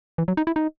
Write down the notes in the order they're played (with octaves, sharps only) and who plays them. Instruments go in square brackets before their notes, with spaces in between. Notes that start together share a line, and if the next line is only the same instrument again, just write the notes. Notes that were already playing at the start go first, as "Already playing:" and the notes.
[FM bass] E3
F#3
D#4
E4
D#4